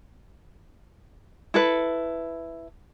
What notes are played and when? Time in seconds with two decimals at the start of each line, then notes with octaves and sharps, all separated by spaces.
1.54 E4 A4 B4